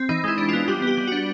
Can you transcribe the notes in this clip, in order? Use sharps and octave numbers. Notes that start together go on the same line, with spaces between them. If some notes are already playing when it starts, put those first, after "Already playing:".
Already playing: C4
E3 D#4
G#3 E4
D4
F4
B3
G3 G4
B3 G4
G3
F#4
D4